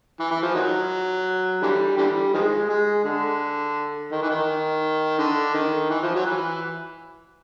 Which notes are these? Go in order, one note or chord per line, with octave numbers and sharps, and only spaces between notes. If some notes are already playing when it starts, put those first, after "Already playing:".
E3
E3
F3
D#3 F#3
D3 E3 G3
D3 E3 G3
D#3 F3 G#3
G#3
D3
D#3
E3
D#3
D3
D#3
E3
F3
F#3
E3